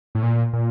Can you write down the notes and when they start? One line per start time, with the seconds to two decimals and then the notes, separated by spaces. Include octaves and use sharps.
0.15 A2
0.23 A#2
0.53 A#2